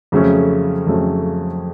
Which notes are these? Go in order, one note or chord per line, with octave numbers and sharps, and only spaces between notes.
F2 C#3 F#3 A3 C#4
F2 C#3 F#3 A3 C#4